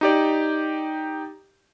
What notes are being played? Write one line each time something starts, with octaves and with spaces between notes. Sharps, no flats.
D#4 G4 D5